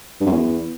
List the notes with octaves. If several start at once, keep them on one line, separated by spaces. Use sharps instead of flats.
G2
F#2
E2